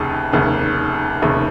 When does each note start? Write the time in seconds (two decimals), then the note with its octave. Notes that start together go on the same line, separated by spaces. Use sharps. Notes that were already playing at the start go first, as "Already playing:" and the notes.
Already playing: F1 D#2 C#3
0.33 F1 D#2 C#3
1.22 F1 D#2 C#3